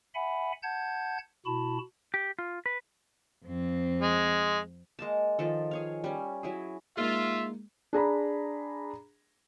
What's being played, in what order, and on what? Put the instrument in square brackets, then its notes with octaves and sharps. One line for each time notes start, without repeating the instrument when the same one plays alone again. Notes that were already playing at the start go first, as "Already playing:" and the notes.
[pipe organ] E5 F#5 G#5 B5
F#5 A5 G6 G#6
B2 E4 F#4 A5 B5
[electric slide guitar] G4
F4
B4
[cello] F2 C4
[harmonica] G#3
[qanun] G#3 A#3 A5
D#3 F3 A4
G#4 C#5 F5
G3 C#4
F#3 E4 G#4
[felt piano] G#3 A#3 D#4 [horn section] F4 [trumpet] E5
[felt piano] D4 G#4 A#5 B5